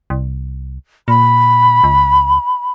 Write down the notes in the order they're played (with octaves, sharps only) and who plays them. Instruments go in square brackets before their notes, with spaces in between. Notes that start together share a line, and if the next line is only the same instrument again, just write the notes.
[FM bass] C2
[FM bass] A#2 [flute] B5
[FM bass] C#2